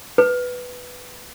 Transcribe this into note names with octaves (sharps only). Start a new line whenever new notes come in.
B4